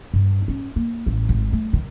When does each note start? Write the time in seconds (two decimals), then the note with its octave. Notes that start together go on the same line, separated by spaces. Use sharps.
0.14 G2
0.48 C#4
0.76 A#3
1.06 A1
1.29 G#1
1.53 A3
1.73 D#3